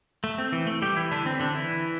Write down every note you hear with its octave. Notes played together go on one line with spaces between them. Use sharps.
A3
C4
E3
A3
G3 G4
E3 E4
D3 D4
C4
D3 D4
E3 E4